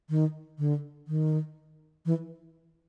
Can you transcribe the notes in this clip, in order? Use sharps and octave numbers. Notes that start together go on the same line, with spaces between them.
D#3
D3
D#3
E3